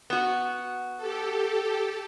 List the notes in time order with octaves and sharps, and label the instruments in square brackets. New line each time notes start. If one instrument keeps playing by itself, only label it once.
[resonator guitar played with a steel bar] B3 F#4
[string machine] G4 A4